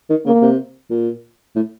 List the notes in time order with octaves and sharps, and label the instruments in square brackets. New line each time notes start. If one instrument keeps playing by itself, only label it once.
[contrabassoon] D#3
[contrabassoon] C#3 [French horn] A#3
[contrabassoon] C3
A#2
A2